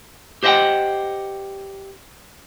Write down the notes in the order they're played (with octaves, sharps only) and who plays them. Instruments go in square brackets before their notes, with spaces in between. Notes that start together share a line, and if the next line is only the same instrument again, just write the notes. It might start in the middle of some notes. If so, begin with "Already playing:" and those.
[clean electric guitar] G4 C5 D#5 E5 F#5 G5